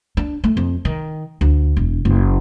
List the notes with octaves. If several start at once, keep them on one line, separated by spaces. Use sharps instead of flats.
D4
A3
F2
D#3
D2
E1
F#1